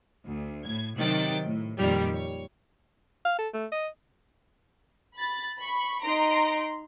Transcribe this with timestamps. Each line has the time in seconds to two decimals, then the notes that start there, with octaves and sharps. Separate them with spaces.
0.24 D2
0.65 A2 G#6
0.97 C3 D#3 F#3 G5 F#6 A6
1.44 A2
1.78 F2 A#2 D#3 G3 F6
2.13 C#5
3.25 F5
3.39 A4
3.54 A3
3.72 D#5
5.17 B5 A6
5.59 B5 C#6
6.03 D#4 A#5 C6 D7